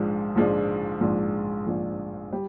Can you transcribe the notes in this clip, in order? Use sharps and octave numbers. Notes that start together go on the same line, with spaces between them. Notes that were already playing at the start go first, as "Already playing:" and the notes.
Already playing: A#1 G#2 F3 G#3 D4
A#1 G#2 F3 G#3 D4
A#1 G#2 F3 G#3 D4
A#1 G#2 F3 G#3 D4
G3